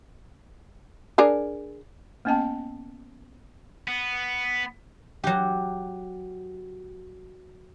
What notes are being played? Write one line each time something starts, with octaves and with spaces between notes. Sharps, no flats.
D4 G#4 A#4
A#3 B3 C#4 D#5 G5 A5
B3
F#3 G4